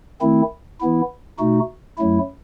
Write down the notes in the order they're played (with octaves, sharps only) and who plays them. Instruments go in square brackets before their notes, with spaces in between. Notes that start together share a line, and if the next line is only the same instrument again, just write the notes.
[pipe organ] D#3 A3 C4 E4
E3 B3 E4
B2 A3 D#4 F#4
F#2 F#3 A3 E4